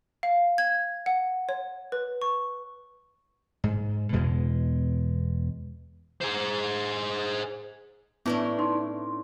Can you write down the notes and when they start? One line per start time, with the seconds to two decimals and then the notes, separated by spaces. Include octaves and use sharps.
0.23 F5
0.58 G#6
1.06 F#5
1.49 C#5
1.92 B4
2.22 C#6
3.64 G#2
4.13 E2 B2 G#3
6.21 G#4 C5
8.26 A2 B3 C#4 D4 E4 B4
8.59 D#4 C6